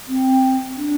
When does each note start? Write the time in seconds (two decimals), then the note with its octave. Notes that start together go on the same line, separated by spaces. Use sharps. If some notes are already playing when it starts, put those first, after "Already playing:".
0.07 C4
0.76 D4